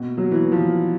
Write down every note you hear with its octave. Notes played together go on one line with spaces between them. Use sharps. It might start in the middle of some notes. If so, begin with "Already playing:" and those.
Already playing: B2
F#3
E3
F3